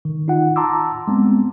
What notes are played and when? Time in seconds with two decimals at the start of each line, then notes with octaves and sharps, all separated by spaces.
0.05 D#3
0.28 D#4 F4 F#5
0.56 A5 A#5 C6 D6 E6
1.08 G#3 B3 C4